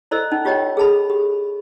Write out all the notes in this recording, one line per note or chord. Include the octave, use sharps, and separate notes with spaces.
E4 A4 C5 D5 D#5 E6
C#4 D#4
F4 G4 C#5 D#5 G5
G#4 A4 A5 B5
G4